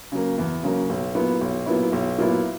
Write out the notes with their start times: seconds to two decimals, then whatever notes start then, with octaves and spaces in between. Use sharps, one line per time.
0.12 C#3 F#3 A#3
0.38 E2
0.63 C#3 F#3 A#3
0.89 B1
1.15 A#2 F#3 B3 E4
1.41 B1
1.66 A#2 F#3 B3 E4
1.92 B1
2.18 A#2 F#3 B3 E4